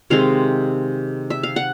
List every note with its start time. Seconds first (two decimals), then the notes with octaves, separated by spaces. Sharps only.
0.10 C3 D#3 G#3 C4 F5
1.30 E5
1.43 F5
1.56 F#5